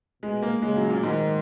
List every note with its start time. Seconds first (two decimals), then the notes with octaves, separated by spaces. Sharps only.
0.22 B2 G#3
0.42 A#3
0.62 C#3 G#3
0.76 F#3
0.90 A#2
1.03 G#2 D#3